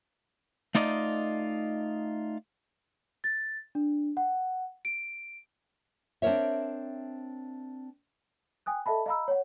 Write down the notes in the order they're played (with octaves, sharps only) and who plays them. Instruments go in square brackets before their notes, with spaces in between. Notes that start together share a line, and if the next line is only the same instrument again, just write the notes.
[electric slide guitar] A3 D#4 F4 D5 D#5
[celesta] A6
D4
F#5
D7
[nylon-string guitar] C4 D4 F4 A#4 C#5 E5
[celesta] G5 G#5 D#6 F#6
A4 D#5 E5 A5 B5
D#5 F5 A#5 B5 E6
C#5 F#5